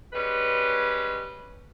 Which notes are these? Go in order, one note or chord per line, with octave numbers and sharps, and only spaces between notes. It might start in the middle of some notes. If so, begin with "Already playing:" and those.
G3 G#3 C#4 B4